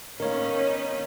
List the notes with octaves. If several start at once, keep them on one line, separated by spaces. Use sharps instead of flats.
D#3 A#3 B3 C#4 D#4 A#4 C#5